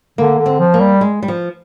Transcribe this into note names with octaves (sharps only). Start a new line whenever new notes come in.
D3 A#3
D3
C4
F3
A#3
G3
G#3
G3
F3